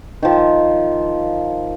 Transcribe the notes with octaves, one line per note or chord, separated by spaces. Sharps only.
D#3 F3